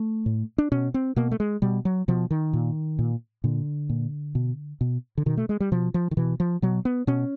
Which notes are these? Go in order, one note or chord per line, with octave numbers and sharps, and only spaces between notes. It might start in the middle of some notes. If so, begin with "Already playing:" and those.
Already playing: A3
A2
D4
B2 C#4
C4
B2 A#3
A3
G#3
B2 G3
F#3
B2 F3
D#3
A#2
A#2
A#2 D3
A#2
B2
B2
D3
B2 D#3
A3
G#3
G3
B2 F3
F3
D#3
B2 E3
F3
B2 F#3
B3
B2 C#4